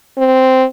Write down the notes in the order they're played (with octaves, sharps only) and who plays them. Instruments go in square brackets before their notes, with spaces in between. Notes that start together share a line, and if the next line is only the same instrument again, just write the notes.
[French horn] C4